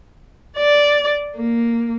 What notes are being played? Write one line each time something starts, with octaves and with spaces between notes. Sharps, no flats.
D5
A#3